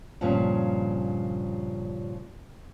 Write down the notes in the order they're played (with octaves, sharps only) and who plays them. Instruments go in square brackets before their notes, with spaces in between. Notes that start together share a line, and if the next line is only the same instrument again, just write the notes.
[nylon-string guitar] G2 A#2 C#3 F3